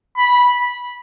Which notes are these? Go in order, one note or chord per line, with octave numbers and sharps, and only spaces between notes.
B5